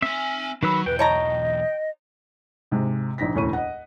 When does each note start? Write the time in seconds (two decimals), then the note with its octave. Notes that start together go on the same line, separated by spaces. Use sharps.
0.02 C4 E5 G#5
0.63 D#3 F#3 B4 B5 E6
0.86 B1 E2 B4 G5
0.99 C#5 D#5 A5 A#5
2.72 G#2 C3 G#3
3.18 A#1 D#4 A#6 B6
3.34 E1 D2 A2 C#4 C#6 D#7
3.53 D#5 F#5